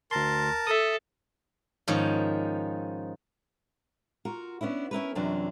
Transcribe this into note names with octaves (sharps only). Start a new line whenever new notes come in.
D2 A#4 A5 C6
A4 E5 D#6
G#2 D#3 F3 C#4
F4 F#4 A#4
B3 C#4 D4 E4
C#4 E4 A#4 B4
F#2 C3 E3 F#3 D4 F4